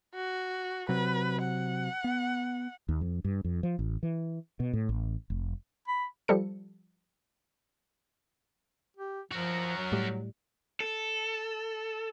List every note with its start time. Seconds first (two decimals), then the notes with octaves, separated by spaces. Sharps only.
0.15 F#4
0.89 C3 F#3 B4
1.43 F#5
2.04 B3
2.89 D#2
3.01 F2
3.24 G2
3.44 F2
3.63 F3
3.79 A1
4.03 E3
4.60 B2
4.73 A2
4.89 A1
5.30 F1
5.88 B5
6.28 F3 G3 A4 C#7
8.97 G4
9.32 F3 F#4 A#4
9.77 F#3
9.92 A2 G3
10.80 A4